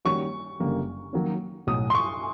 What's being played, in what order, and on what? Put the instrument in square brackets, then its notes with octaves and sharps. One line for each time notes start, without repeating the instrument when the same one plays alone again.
[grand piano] D#3 G3 A#3 C#4 F#4 [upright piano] C#6
[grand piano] F#1 F#2 D3 G3 A#3
D#3 F#3 A#3 C#4
[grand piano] B1 A2 F#3 [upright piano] D#6
[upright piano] C6
C#6